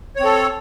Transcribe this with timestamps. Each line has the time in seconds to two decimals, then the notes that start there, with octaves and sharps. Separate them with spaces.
0.16 C#5
0.20 C4
0.25 A4